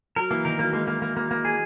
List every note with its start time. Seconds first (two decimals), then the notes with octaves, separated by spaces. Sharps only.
0.16 F#3 A#4
0.31 E3 A#3
0.45 D#3 A#4
0.59 F#3 A#3
0.73 G#3 A#3
0.87 A#3
1.02 A#3
1.17 A#3
1.31 A#3
1.45 G#4